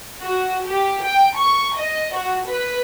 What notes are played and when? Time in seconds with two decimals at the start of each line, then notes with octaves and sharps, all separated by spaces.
0.21 F#4
0.66 G4
1.02 G5
1.37 C#6
1.77 D#5
2.14 F#4
2.46 B4